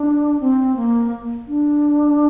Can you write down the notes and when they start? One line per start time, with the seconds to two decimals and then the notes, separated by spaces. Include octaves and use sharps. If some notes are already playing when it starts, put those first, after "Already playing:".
Already playing: D4
0.40 C4
0.76 A#3
1.47 D4